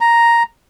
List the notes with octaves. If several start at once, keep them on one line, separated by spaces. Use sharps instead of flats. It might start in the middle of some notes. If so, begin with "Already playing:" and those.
A#5